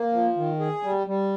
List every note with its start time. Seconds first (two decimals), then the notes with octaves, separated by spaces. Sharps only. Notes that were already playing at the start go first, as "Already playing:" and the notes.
Already playing: A#3
0.13 F3
0.37 D#3
0.60 G#4
0.83 G3
1.07 G3